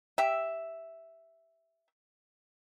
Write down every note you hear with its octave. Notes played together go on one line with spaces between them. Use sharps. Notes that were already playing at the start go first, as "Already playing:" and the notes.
G4 E5